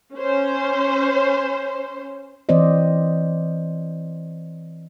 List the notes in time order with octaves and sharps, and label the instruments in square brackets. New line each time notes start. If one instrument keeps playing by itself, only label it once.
[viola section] C#4 C5
[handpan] E3 C4 C5 D5 D#5